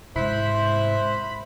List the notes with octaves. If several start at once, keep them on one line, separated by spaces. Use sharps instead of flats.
G#2 C3 E4 C5 B5 F#6